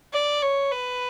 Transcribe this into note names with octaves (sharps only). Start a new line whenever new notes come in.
D5
C#5
B4